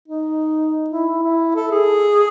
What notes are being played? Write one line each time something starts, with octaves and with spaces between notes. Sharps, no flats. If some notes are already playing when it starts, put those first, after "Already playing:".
D#4
E4
E4
A4
G#4